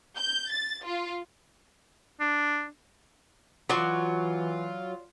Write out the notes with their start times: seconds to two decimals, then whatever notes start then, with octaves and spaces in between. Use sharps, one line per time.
0.18 G6
0.52 A6
0.86 F4
2.20 D4
3.70 E3 F#3 F4 D5 C6 C#6